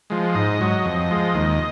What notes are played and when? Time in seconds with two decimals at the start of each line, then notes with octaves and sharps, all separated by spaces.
0.10 F3 G#3
0.35 G#2 D#5
0.61 F#3
0.86 F2
1.11 F3 G#3
1.35 D#2